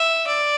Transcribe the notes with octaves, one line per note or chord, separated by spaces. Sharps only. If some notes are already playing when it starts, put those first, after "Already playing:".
Already playing: E5
D5